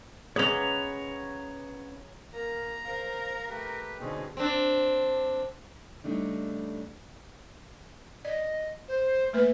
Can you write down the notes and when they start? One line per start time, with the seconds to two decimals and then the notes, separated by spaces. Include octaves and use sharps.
0.36 C#3 G#3 B3 C#4 G#4 C#5 A#5 F#7
2.33 A#3 A#4 A#5
2.85 A#4 C5 F5
3.49 A3 G4 B4 A#5
4.00 B2 D3 C4 C#4 D#4 G#4
4.37 C4 D4
6.04 C#3 F3 G3 A3 D4 D#4
8.25 D5 D#5
8.88 C5
9.33 A3 A#3 B4 E5